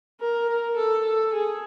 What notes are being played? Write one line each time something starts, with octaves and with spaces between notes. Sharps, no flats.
A#4
A#4
A4
A4
G#4